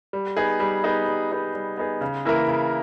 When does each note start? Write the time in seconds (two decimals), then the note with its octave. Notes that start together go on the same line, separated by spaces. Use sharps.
0.13 G3
0.37 B3 D#4 G#4
0.60 G3
0.84 B3 D#4 G#4
1.08 G3
1.31 B3 D#4 G#4
1.54 G3
1.77 B3 D#4 G#4
2.01 C#3
2.25 E3 A#3 E4 A#4
2.48 C#3